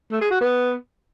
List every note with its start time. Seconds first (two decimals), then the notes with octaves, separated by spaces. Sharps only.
0.11 A3
0.21 G#4
0.31 F#4
0.41 B3